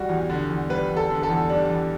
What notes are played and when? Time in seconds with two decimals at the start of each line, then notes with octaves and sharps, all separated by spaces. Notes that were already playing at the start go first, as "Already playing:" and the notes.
Already playing: G3 F#4
0.09 E2
0.30 D3
0.49 E2
0.69 G3 B4
0.90 E2
0.97 A4
1.10 D3
1.23 A4
1.30 E2
1.49 G3 D4
1.70 E2